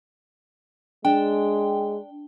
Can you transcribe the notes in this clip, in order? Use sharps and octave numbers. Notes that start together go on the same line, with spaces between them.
G#3 D4 G5